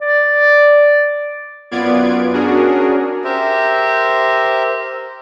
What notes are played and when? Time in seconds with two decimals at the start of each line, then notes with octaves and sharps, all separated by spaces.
0.01 D5
1.71 F#2 B3 F4 D5 G#6 D7
2.34 C#4 D4 F#4 G#4 A#4
3.24 G4 A#4 C5 E5